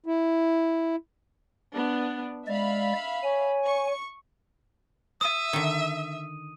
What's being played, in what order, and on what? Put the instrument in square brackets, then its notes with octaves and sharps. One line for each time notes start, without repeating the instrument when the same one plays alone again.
[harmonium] E4
[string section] B3 D4
[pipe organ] G#3 D5 [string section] E5 F5 B5
[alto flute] C#5 [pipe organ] G#5
[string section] C#6
[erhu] E5 [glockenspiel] D#6 D#7
[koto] D3 D#3